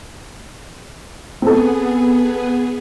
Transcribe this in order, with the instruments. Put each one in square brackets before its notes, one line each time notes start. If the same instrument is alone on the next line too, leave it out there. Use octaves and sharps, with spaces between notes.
[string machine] B3 G#4 [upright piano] C4 A4